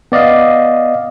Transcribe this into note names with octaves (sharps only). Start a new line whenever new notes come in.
B3 D5 D#5 F5